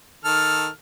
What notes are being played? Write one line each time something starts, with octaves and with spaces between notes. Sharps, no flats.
D#3 A4 F6